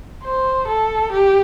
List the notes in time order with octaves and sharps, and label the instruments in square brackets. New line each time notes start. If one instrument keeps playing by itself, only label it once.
[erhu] C5
A4
G4